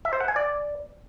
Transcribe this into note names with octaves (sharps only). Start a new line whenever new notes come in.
E5
C5
F#5
G#5
D5